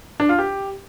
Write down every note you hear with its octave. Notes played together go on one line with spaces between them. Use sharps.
D4
F4
G4